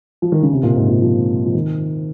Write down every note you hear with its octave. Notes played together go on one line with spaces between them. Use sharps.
F3
D#3
C#3
C3
A#2
G#2
A#2
F3
F3
D#3